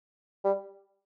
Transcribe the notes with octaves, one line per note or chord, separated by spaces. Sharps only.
G3